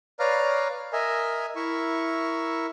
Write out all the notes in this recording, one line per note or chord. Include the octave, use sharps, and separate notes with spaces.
B4 C#5 D5 F5 A#5 F6
A#4 D#5 E5 G#5
E4 A#4 E5 C#6